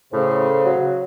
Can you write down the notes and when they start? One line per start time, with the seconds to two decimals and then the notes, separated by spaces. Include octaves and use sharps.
0.13 A2 C#3 C5
0.65 F#3